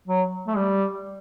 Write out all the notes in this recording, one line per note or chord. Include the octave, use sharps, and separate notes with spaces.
F#3
A3
G3